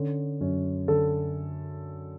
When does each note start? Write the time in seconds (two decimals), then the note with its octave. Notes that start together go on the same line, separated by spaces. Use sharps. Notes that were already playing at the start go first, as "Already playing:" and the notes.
Already playing: D3 C#4
0.41 F#2 C#4
0.88 D3 A4